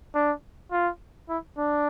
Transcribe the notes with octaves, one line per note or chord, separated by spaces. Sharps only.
D4
F4
E4
D4